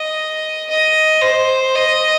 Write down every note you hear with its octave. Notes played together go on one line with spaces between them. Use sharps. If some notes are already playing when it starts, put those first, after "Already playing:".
Already playing: D#5
D#5
C5
D#5